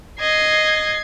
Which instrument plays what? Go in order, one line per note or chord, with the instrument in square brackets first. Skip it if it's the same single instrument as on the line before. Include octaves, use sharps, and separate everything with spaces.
[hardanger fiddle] D#5 [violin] G#6 C7